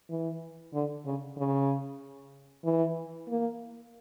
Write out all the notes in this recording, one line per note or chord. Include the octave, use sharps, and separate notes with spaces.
E3
D3
C#3
C#3
E3
A#3